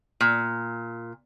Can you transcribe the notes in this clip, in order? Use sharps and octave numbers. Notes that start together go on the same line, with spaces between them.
A#2